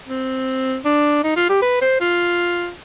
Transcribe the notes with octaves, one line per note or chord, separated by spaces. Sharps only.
C4
D4
D#4
F4
G4
B4
C5
F4